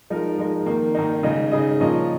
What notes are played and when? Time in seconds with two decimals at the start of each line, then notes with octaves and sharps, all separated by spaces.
0.10 F3 G#3 D#4 A#4
0.38 F3 G#3 D#4 A#4
0.66 D#3 A#3 D#4
0.95 D#3 A#3 D#4
1.23 C#3 G#3 D#4 G#4 D#5
1.51 C#3 G#3 D#4 G#4 D#5
1.80 A#2 F3 C#4 A#4 D#5